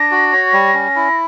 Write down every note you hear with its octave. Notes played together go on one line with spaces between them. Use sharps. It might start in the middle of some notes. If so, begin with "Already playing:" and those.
Already playing: D4 A#6
F#4
C#5
G3
C#4
E4